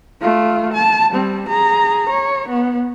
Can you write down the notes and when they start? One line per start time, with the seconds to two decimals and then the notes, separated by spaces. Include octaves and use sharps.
0.22 A3 F4
0.73 A5
1.11 G3 C4
1.49 G#4 A#5
2.09 C#5
2.49 B3